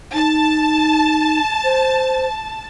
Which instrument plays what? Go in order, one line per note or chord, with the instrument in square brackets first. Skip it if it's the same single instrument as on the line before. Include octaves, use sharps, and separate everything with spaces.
[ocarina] D#4 [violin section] A5
[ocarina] C5